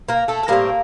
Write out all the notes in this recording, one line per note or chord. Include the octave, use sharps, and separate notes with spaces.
A#3 A#4
A3 A4
A4
A2 G3 A#3 C4 A#4